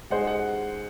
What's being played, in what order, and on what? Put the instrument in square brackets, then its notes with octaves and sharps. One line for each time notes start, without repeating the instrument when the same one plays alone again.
[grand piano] G#3 D#4 G#4 C5 [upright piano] F#5
[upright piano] F#5